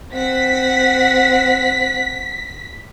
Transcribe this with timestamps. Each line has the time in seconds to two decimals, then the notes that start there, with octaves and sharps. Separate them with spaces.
0.14 C4 F#5 B6